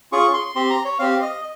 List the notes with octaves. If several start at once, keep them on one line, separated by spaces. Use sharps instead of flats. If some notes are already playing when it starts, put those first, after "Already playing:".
C#4 F4 G#4 C#6
C6
C4 G4 C6
A#5
C#5
C4 G4 F5
D#5